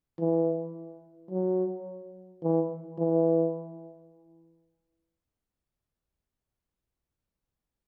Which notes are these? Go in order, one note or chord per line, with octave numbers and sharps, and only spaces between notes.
E3
F#3
E3
E3